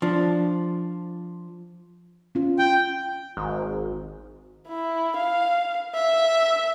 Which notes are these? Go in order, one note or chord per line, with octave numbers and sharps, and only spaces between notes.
F3 D4
C#4 F4
G5
G#1
E4
F5
E5